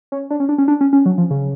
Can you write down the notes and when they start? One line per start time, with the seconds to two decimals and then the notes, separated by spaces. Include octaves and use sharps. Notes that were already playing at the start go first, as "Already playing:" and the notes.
0.12 C#4
0.30 D4
0.40 C#4
0.49 D4
0.58 C#4
0.68 D4
0.81 C#4
0.93 C#4
1.06 F#3
1.18 F3
1.30 C#3